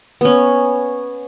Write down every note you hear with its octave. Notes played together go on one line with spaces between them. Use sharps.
B3 C#4